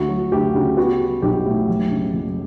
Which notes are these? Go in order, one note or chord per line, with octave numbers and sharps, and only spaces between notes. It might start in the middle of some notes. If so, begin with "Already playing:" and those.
Already playing: D2 F#4
F#3
D2 G4
C#3
B3 F#4
G3
B1 G4
A2
F#1
C#3
F#1